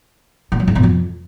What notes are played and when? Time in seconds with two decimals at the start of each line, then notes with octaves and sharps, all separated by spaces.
0.52 A#2
0.60 F#3
0.67 G#2
0.75 B2
0.83 F2